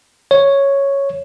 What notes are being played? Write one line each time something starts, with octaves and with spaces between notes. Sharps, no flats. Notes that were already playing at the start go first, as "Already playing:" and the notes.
C#5